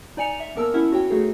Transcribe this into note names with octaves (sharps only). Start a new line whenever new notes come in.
D#4 D5 G#5 C#7 F7
E5
A#3 B3 A#4 A5 E6
C#4 E4 E5 F#5
F#4 C#5 G5
A3 D#4 F#4 G#4 A4